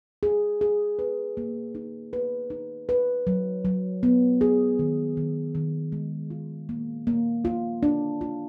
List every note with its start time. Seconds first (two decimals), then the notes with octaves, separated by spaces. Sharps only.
0.23 G#4
0.61 G#4
0.99 B4
1.37 A#3
1.75 D#4
2.13 B4
2.50 D#4
2.89 B4
3.27 F#3
3.65 F#3
4.03 B3
4.41 G#4
4.79 D#3
5.17 D#3
5.55 D#3
5.92 G#3
6.30 F4
6.69 A#3
7.07 A#3
7.45 F4
7.83 D4
8.21 F4